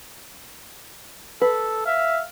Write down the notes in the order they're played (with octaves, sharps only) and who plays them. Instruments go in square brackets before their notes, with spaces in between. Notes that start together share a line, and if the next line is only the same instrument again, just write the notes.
[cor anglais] A4 [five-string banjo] B4
[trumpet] E5 [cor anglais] F5